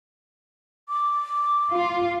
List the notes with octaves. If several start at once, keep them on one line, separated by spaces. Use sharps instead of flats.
D6
F4